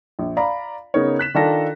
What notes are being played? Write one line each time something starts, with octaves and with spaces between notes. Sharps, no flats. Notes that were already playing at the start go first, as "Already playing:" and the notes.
A#1
D5 F5 A#5 B5
C#3 B3 D#4 A#4 C#5
F#6 B6 E7
D#3 D4 F4 A4 A#6